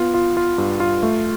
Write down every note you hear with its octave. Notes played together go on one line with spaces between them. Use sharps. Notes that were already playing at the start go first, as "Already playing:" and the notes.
Already playing: B3 F4
F4
F4
G2
F4
A3